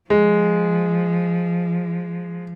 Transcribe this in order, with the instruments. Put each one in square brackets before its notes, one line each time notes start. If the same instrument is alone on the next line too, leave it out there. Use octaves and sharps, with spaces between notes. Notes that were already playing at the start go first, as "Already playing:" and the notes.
[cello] F3 [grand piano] G#3